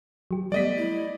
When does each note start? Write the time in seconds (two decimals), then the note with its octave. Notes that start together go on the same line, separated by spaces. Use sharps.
0.31 F#3 G4
0.52 G3 A3 B3 D5 D#5 B6
0.76 E4